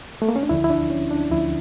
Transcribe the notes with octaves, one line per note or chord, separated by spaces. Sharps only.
A3
A#3
C#4
D4
D2 D3 F3 E4
E4
D4
C#4
D4
D2 D3 F3 E4